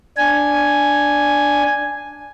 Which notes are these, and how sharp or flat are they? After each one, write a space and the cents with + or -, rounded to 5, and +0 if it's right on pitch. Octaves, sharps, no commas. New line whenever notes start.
D4 +0 G#5 +0